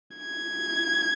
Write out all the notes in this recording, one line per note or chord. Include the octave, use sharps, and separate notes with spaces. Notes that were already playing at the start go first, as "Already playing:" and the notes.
G#6